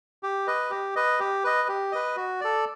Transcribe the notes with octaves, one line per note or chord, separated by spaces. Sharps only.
G4
B4 D#5
G4
B4 D#5
G4
B4 D#5
G4
B4 D#5
F#4
A4 D5